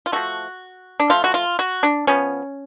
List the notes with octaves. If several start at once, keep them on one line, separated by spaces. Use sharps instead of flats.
F4
F3 A3 F#4
D4
F3 A3 F4
F#4
F4
F#4
D4
F3 B3 C#4